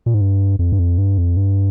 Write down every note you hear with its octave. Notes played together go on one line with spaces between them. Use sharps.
A#2
G#2
G2
F2
G2
F2
G2
F2
G2